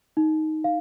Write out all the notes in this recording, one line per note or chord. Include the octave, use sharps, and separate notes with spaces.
D#4
F5